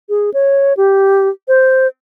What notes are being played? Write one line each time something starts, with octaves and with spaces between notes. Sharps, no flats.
G#4
C#5
G4
C5